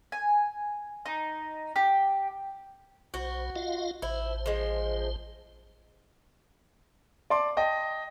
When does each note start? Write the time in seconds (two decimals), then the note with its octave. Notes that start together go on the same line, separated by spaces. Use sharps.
0.12 G#5
1.06 D#4
1.76 G4
3.14 B1 F#4 C5
3.56 F4 D#5 F5
4.02 A1 E4 C5
4.46 F3 G#3
7.30 D5 A5 C6 D6
7.57 D#5 G5 A5